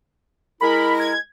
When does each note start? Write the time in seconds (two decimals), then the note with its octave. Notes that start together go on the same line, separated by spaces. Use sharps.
0.61 G#3 E4 A#4 B5
1.00 G#6